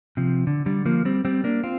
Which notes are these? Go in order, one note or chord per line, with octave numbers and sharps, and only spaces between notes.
C3 F3
D3
D3 G3
F3 A#3
G3 C4
G3 C4
A#3 D4
C4 F4